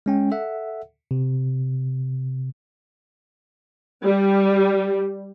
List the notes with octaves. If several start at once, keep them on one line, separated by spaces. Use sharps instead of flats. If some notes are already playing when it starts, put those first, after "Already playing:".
G#3 C#4 G5
A4 E5 F#5
C3
G3